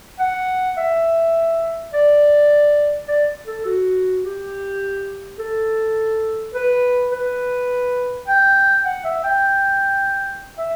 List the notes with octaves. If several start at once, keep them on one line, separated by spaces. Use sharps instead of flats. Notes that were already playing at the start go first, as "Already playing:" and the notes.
F#5
E5
D5
D5
A4
F#4
G4
A4
B4
B4
G5
F#5
E5
G5
E5